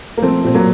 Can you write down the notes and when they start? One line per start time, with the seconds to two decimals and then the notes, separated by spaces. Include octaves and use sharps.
0.17 A#3
0.22 F3 A3 C4
0.44 A#2 C4
0.55 F#3 A#3